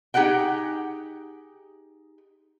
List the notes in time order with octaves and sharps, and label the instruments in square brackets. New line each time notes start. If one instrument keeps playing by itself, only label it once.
[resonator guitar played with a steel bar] D#4 G4 G#4 F#5 G5